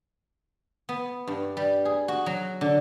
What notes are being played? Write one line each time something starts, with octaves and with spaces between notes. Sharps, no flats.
B3
G2
G3
G#4
F#4
F#3
D3